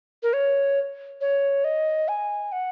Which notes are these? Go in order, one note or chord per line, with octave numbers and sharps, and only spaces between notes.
A#4
C#5
C#5
D#5
G#5
F#5